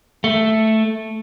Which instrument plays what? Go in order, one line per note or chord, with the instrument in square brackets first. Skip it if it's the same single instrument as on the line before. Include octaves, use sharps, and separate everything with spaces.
[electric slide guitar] A3